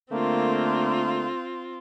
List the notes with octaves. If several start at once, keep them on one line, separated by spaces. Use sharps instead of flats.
D3 A3 A#3 C4 F4